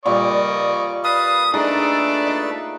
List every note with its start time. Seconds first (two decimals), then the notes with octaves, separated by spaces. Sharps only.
0.06 A#2 G3 D5 D#5 C#6
1.04 B4 F5 A5 D#6
1.54 A3 D4 D#4 G#4 A4 B4 D5 D#5
2.27 D#5